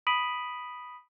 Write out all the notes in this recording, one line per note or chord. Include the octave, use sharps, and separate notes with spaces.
B5 D#6 B6 D7 D#7 F#7